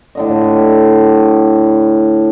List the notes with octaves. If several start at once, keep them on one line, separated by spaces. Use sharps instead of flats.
A2 D3 D#5